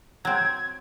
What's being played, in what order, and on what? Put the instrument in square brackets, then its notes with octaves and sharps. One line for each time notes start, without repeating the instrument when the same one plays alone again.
[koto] F#3 C4 [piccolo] G#6